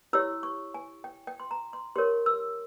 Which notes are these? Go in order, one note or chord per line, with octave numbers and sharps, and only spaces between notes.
E4 G4 C#5 E6
C#6
G#5
G5
G5
C6
A#5
C6
G4 A#4 C#5 C6
E6